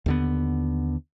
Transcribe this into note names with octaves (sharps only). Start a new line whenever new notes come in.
D#2 D3 B3